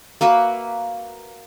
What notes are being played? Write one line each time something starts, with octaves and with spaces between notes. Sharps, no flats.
A#3 F#4 B4 E5